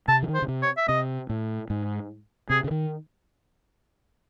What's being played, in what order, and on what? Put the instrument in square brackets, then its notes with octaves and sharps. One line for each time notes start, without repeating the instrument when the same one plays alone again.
[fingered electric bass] C3 [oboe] A5
[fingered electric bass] E3
D#3
[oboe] C5
[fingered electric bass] C#3
C3
[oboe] C#5
E5
[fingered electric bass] C3 [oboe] D#5
[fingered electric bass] A2
G#2
[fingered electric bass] C3 [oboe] G#4
[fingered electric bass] C#3
D#3